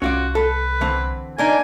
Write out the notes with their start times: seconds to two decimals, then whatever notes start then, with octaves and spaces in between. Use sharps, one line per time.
0.02 C2 C#4 F4 F#4 D5
0.35 A4 B4
0.81 D3 E3 C4
1.38 A#3 D4 D#4 G#5